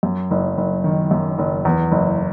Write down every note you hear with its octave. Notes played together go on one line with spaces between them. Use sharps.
F#2
F#1
F#1
D#3
F#2
F#1
E2
F#1